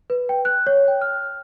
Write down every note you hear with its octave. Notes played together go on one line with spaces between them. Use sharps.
B4
G5
F#6
C#5
G5
F6